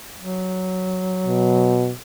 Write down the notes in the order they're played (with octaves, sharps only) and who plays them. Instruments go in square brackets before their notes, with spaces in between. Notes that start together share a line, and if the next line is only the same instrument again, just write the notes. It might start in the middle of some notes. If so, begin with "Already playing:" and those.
[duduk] F#3
[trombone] B2